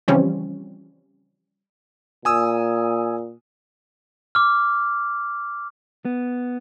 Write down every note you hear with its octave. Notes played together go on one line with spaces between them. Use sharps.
C#3 E3 F3 G3 C4 C#4
A#2 G#5 D#6 E6
D6 F6
B3